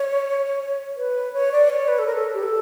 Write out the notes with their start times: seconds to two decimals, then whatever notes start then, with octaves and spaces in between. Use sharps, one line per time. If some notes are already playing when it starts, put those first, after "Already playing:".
Already playing: C#5
0.97 B4
1.33 C#5
1.52 D5
1.70 C#5
1.88 B4
1.99 A4
2.06 A#4
2.16 A4
2.34 G4
2.43 A4